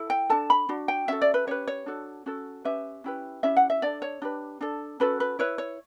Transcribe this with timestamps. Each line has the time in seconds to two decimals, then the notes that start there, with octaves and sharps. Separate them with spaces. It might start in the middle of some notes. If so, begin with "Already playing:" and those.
Already playing: E4 A4
0.10 G5
0.30 D4 A4 A5
0.50 B5
0.69 D4 F#4
0.88 G5
1.08 C#4 F#4 A4 E5
1.22 D5
1.34 B4
1.47 C#4 G4 B4 C#5
1.67 C#5
1.86 D4 F#4 A4
2.26 C#4 F#4 A4
2.65 C#4 G4 B4 E5
3.04 C#4 E4 G4 B4
3.43 C#4 E4 G4 E5
3.57 F#5
3.70 E5
3.82 D4 A4 D5
4.02 C#5
4.22 D4 G4 B4
4.61 D4 A4
5.00 C#4 F#4 A4 B4
5.20 B4
5.39 E4 B4 C#5
5.58 C#5